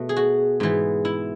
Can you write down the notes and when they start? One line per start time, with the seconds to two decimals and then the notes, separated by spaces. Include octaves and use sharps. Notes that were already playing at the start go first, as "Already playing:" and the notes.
Already playing: B2 A3
0.09 G#4
0.16 F#4
0.60 G#2 E3 B3
1.05 E4